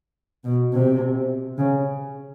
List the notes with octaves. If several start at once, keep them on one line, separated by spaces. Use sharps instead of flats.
B2
C3
C#3